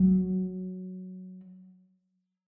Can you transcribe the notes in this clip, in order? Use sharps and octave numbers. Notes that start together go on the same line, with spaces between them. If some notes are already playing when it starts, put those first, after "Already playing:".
Already playing: F#3